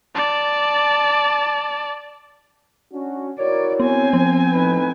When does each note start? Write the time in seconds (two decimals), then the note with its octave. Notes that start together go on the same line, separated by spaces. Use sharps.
0.15 D5 A5
2.92 C#4 D4 F#4
3.39 E4 F#4 A#4 C#5 D5
3.80 B3 C4 G#5
4.13 F3 B3
4.52 A2 D#4 B4